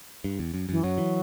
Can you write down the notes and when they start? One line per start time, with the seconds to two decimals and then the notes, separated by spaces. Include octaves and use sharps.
0.24 G2
0.39 E2
0.54 F#2
0.69 F#2 E3
0.84 F#2 F#3
0.98 E3